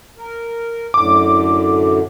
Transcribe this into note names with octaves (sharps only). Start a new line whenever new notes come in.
A#4
F#2 A2 D3 D6